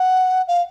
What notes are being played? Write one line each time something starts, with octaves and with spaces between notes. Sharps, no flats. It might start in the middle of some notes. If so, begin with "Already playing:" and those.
Already playing: F#5
F5